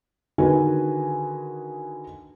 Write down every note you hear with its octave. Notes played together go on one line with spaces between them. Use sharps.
D3 D#3 F#4 G#4 B4 G#5